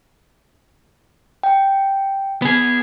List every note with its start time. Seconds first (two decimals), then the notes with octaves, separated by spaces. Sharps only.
1.43 G5
2.42 B3 G#4